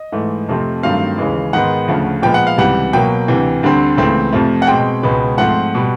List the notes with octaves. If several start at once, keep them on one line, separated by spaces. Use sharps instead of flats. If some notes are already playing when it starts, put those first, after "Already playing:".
Already playing: D#5
G#2 E3 A3
F2 C3 F3 A3 C4
G2 D#3 F#3 A3 C4 F5
D#2 C#3 E3 G#3
G#2 D#3 G#3 B3 F#5
D2 C#3 F3 A3
A#2 F3 G#3 B3 G5
F#5
F5
C#2 C3 E3 G3 F#5
B2 F#3 A#3 G5
D2 C3 E3
D2 D3 G3 C4
C#2 C#3 E3 A3 C4
F2 C3 F3 A3
F#5
B2 G#3 C4 G5
C#2 B2 G#3 B3
G#2 F3 A3 C4 F#5
B2 G3